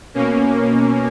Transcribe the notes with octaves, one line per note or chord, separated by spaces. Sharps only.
B2 A#3 C#4